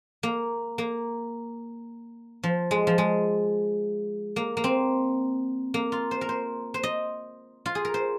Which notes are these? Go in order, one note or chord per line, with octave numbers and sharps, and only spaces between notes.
A#3
A#3
F3
G#3
F3
G#3
A#3
A#3
C4
A#3
F4
C5
A#4
C5
C5
D#5
F4
G#4
A#4
C5